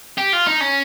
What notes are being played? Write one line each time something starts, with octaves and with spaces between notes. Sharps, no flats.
G4
F4
D#4
C#4